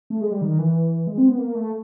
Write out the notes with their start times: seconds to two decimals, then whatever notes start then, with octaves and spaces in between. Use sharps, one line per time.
0.10 A3
0.21 G#3
0.32 G3
0.42 D#3
0.58 E3
1.07 G#3
1.18 C4
1.28 B3
1.39 A#3
1.55 A3